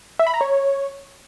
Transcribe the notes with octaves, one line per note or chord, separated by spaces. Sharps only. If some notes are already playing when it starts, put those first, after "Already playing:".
E5
B5
A#5
C#5